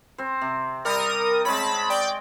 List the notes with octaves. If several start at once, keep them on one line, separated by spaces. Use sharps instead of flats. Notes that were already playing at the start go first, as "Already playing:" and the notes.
C4 C5
C3
G3 A#4 D#6
G#3 C4 C#5 A5 B5
D5 G5